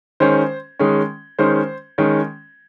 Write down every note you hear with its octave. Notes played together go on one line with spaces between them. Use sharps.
D#3 G#3 C#4 C5
D#3 G#3 C#4
D#3 G#3 C#4 C5
D#3 G#3 C#4